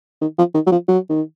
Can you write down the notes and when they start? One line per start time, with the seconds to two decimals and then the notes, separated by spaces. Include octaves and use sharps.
0.21 D#3
0.38 F3
0.54 D#3
0.67 F#3
0.72 F3
0.88 F#3
1.10 D#3